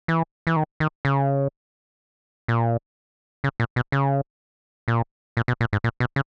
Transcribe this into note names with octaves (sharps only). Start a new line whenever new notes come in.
E3
E3
D#3
D#3
C#3
A#2
C#3
A#2
B2
C#3
A#2
A#2
B2
A#2
G#2
A#2
B2
C#3